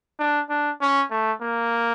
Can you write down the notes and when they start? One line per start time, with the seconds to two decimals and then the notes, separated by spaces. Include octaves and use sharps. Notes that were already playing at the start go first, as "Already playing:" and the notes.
0.19 D4
0.49 D4
0.81 C#4
1.10 A3
1.41 A#3